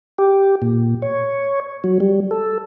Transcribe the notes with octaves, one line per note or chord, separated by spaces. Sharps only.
G4
A#2
C#5
F#3
G3
A4